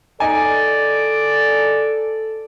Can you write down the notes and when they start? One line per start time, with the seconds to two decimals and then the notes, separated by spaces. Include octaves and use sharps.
0.20 D#4 A4 D5 G#5